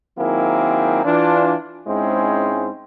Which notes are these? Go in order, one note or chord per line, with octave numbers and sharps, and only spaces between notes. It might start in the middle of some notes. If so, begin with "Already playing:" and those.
D#3 F#3 A#3 C4 E4 G#4
E3 D4 F4
G#2 G#3 C4 C#4 E4 C5